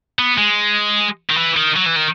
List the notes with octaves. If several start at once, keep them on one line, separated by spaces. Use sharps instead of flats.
B3
G#3
D#3
E3
D#3
F#3
E3
D#3